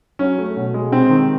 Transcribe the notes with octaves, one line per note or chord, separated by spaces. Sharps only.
F#3 C#4
A3
B2
G#3
C3 C4
D#3